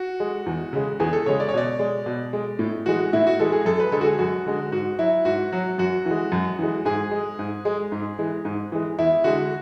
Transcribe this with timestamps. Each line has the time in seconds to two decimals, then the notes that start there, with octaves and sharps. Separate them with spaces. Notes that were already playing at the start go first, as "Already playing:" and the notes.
Already playing: F#4
0.20 G#3
0.46 E2
0.73 C#3 G#3
1.00 E2 G#4
1.13 A4
1.26 C#3 G#3 C#5
1.40 D5
1.49 C#5
1.54 B2 D5
1.79 G#3
2.06 B2
2.33 G#3
2.59 A2
2.86 E3 G#3 F#4
3.13 A2 E4
3.27 F#4
3.39 E3 G#3 A4
3.52 G#4
3.65 F#2 A4
3.80 B4
3.92 D3 G#3 A4
4.01 F#4
4.06 G#4
4.19 F#2 F#4
4.46 D3 G#3
4.72 G#2 F#4
4.99 F#3 E4
5.25 G#2 F#4
5.52 F#3 F#4
5.78 F#2 F#4
6.06 E3 G#3
6.32 F#2
6.59 E3 G#3
6.85 G#2 G#4
7.11 G#3
7.39 G#2
7.65 G#3
7.92 G#2
8.19 E3 G#3
8.45 G#2
8.72 E3 G#3
8.99 E2 E4
9.24 D3 G#3 F#4